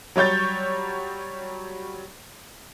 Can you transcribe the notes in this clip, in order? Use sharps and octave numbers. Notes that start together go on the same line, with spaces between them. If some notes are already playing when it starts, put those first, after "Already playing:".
F#3 G3 C#5 G6 A6